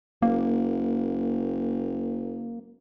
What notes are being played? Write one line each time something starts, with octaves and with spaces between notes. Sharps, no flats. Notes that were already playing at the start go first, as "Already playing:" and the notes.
F#1 A#3